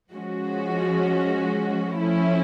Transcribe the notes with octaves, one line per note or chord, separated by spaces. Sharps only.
F3 G#3 C#4 F#4
F3 A3 C#4 E4